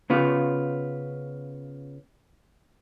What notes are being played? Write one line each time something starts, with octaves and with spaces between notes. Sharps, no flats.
C#3 B3 F4